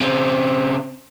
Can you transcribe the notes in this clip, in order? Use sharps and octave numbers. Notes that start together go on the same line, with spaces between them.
C#3 C4